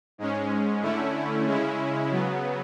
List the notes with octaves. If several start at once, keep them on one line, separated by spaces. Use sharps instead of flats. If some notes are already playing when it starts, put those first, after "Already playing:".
G#2 G#3 C#4
D3 A3 C#4 E4
C#3 G#3 C#4 E4
C#3 F#3 B3